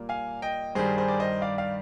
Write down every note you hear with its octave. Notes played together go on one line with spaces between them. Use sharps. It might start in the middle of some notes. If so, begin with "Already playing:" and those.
Already playing: A#2 G3 A#3
F5 G#5
D#5 G5
G2 D#3 G3 G#4 C5
G#4 C5
D5
C5 D#5
D5 F5
D5 F5